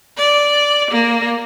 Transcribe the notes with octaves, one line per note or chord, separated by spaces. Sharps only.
D5
A#3